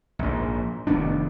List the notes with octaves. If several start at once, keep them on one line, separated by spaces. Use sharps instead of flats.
A#1 G#2
F1 D#3 B3 D4